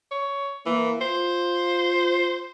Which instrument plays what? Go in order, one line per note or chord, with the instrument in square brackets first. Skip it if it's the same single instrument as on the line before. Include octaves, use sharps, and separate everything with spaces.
[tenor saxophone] C#5
[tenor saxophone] E3 [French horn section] A#3
[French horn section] F4 [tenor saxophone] C5